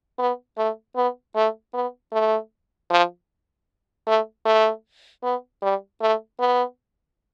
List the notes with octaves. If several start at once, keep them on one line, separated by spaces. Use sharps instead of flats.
B3
A3
B3
A3
B3
A3
F3
A3
A3
B3
G3
A3
B3